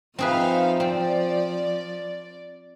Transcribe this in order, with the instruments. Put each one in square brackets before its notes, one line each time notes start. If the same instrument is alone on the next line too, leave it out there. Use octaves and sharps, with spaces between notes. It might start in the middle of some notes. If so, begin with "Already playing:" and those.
[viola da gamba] F3 [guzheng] C4 G#4 B4 [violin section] D#4 E5 F5
[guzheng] C4 [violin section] D5